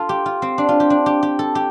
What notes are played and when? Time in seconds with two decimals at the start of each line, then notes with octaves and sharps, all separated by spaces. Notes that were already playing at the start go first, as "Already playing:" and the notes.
Already playing: F4 A4
0.09 G4
0.26 F4
0.42 C4
0.58 D4
0.69 F4
0.80 G4
0.90 D4
1.06 G4
1.23 G4
1.39 A4
1.55 G4